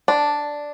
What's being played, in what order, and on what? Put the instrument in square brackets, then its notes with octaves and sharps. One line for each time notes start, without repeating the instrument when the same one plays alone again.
[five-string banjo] D4